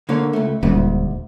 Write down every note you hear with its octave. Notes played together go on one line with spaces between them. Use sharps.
D3 A#3 C#5
C#2 A3
D#1 D2 G#2